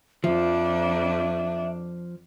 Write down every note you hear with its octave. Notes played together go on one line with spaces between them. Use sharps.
F2 F3 D4 E5